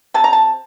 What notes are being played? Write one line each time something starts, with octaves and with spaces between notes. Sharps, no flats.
C3 A5
A#5
A5